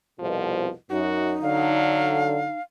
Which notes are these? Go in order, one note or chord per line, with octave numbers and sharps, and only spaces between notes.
C2 F2 B2 F3
F#2 D#4 F#4
D3 F#3 F5